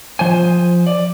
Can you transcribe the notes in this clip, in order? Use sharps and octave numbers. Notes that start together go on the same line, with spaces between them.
F3 C5 G#5
D5